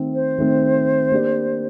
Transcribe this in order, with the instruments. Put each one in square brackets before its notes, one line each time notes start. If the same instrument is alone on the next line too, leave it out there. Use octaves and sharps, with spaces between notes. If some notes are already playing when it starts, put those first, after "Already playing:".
Already playing: [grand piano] D#3 A3 C4
[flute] C5
[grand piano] D#3 A3 C4
A#3 D4 G4 D5